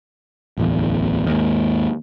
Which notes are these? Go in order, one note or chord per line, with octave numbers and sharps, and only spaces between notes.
D1 A1 E2
D#2 G#2